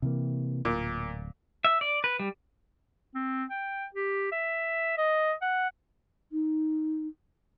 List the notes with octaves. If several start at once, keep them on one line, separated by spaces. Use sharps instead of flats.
C3 E3 A#3
D1 A#2
E5
D5
B4
G3
C4
G5
G4
E5
D#5
F#5
D#4